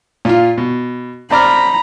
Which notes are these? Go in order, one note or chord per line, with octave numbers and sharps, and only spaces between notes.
A#2 F4
B2
C4 D5 A#5 B5 F6